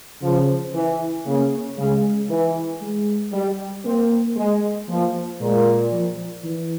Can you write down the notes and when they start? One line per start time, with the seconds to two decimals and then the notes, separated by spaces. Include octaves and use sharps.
0.21 C#3 F3
0.73 E3
1.26 C#3 A#3
1.78 C#3 G#3
2.29 E3
2.81 G#3
3.32 G3
3.85 A#3 C4
4.36 G#3
4.88 F3 A#3
5.40 A#2 G#3
5.92 F3
6.44 E3